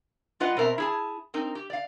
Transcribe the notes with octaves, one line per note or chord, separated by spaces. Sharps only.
G3 F4 B4 D#5 F#5
B2 C4 A#4 E5
E4 G#4 A5
C4 D#4 A#4
G4
D5 F5